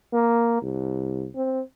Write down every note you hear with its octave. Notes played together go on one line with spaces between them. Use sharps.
A#3
C2
C4